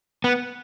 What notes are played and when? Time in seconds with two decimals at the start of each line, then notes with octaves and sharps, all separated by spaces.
0.24 B3